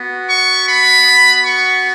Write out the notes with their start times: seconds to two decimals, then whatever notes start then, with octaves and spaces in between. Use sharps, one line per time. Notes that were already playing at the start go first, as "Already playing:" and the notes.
Already playing: B3 F#4
0.27 C#6
0.67 B5
1.44 C#6